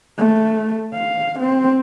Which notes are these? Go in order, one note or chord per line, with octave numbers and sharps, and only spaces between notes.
A3
F5
C4